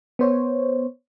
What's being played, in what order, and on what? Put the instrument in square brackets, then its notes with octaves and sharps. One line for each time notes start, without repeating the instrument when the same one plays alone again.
[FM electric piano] B3 C5 C#5